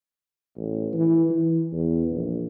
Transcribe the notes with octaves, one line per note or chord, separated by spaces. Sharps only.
A1
E3
E3
E2
A#1